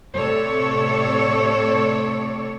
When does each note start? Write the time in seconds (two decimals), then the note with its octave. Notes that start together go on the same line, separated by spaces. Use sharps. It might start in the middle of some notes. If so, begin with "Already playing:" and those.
0.16 A2 C3 A4 C#5 D5